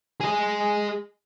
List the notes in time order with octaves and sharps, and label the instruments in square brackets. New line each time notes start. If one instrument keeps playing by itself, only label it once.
[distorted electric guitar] G#4 D#5